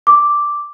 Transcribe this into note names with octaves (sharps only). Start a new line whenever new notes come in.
D6